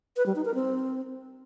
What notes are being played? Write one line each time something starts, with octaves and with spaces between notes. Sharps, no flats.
B4
G3
D#4
A#4
C4